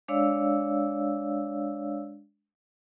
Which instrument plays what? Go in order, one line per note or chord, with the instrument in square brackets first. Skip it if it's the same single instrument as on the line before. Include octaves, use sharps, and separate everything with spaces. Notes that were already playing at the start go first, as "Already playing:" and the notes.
[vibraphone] G#3 D4 C#5 D5 F5 E6